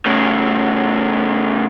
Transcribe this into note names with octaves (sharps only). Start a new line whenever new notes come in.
A2 C#3